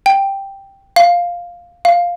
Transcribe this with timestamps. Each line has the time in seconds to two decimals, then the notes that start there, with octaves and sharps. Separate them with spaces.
0.06 G5
0.96 F5
1.85 F5